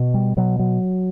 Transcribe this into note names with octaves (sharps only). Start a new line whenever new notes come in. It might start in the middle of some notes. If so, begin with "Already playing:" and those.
Already playing: B2
G3
B2 F#3
F#3